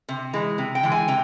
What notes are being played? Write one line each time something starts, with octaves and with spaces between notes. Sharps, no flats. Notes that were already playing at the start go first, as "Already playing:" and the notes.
C3
E3 G#3
C3
G5
E3 G#3
G#5
C3 G5